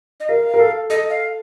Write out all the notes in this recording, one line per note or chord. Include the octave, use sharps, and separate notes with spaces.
D#5
A#4 F5
A#4
A4
A4 D#5
F5